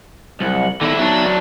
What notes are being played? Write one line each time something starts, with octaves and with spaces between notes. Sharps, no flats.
C2 F#3
D3 D#3 B3 D#4 E4
F#3 B3 D4 D#4 E5